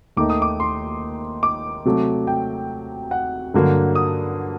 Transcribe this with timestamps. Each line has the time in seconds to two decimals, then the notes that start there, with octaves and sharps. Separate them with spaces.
0.17 D#2 D#3 A3 D#4 D6
0.30 D#6
0.42 D6
0.60 C6
1.43 D6
1.85 C3 F#3 A3
2.27 G5
3.11 F#5
3.54 G2 D3 F#3 A#3
3.95 D#6